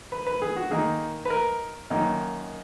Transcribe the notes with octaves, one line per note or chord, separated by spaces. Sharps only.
B4
B4
G#4
F#4
D#3 A#3 D#4 G#4
B4
A#4
F#2 D#3 A#3 D#4